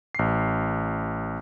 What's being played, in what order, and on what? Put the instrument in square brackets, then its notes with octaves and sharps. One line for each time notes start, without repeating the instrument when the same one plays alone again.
[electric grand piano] A1 C7